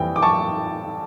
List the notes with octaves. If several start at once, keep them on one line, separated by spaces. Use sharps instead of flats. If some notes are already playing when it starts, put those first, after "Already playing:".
Already playing: F2 E3 G3 G5
D6
A5 C#6